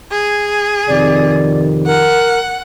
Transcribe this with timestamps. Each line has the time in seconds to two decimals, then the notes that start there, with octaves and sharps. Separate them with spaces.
0.11 G#4
0.88 F2 C3 D#3 D5
1.86 A#4 F#5